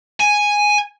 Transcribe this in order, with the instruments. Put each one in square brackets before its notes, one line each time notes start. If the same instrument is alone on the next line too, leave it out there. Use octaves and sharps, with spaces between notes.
[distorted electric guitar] G#5